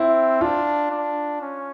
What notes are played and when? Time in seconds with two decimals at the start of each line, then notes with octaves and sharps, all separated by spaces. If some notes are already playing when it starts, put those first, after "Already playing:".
Already playing: C4 E4
0.41 D4 F4
0.91 D4
1.42 C#4